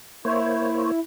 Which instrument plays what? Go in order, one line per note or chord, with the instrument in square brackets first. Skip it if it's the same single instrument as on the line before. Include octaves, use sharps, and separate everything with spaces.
[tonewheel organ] A#3 C5 C#5 [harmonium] E4